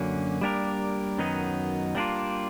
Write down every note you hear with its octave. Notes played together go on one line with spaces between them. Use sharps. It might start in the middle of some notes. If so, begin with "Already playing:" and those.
Already playing: F#2 D3 F#3 A#3 C#4
G3 A#3 D4 G4 A#4
F#2 D#3 F#3 B3 D#4
G3 A#3 D4 F4